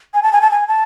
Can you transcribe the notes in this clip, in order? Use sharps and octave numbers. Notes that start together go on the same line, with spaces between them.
G#5
A5
G#5
A5
G#5
A5